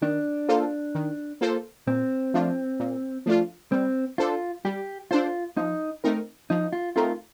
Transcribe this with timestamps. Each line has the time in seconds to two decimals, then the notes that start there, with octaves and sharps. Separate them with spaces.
0.02 D#3 D4
0.48 A#3 F4 A4 C5
0.95 D#3
1.41 A#3 F4 A4 C5
1.87 A#2 C4
2.34 F3 A3 D4 F4
2.80 A#2
3.26 F3 A3 D4 F4
3.72 G3 C4
4.18 D4 F4 A4 C5
4.65 G3 G4
5.11 D4 F4 A4 C5
5.57 F3 D#4
6.04 A3 C4 D#4 A#4
6.50 F3 D#4
6.73 F4
6.96 A3 C4 D#4 F4 A#4